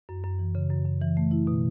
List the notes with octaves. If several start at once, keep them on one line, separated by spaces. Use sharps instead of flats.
F#2
F#2
E3
C#3
F#2
F#2
E3
A3
E4
B2